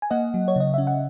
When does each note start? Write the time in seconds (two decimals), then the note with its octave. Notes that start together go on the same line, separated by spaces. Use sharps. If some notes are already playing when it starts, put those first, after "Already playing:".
0.02 G#5
0.11 A#3 D#5 F#5
0.34 F#3
0.48 C#5
0.56 C#3 D#5
0.74 C#4 E5
0.87 F#5